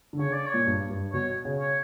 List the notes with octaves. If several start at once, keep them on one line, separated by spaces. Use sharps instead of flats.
D3
C#3 C#5
D5
C#5
A#2
G2
G2
B2 C#5
C#3
C#5